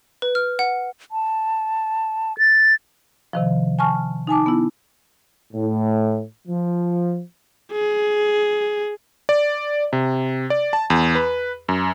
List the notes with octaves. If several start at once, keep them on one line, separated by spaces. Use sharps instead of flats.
B4
F6
F#5
A5
A6
C3 D#3 F3
G#5 A5 C#6 F6
D#4 G#5 A5 D6
B3 E4
A2
F3
G#4
D5
C3
D5
A5
E2
B4
F#2